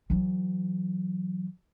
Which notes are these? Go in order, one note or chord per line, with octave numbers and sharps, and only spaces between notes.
E3 F#3